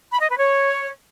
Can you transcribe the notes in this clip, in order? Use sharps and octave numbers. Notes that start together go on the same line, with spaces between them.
B5
D#5
B4
C#5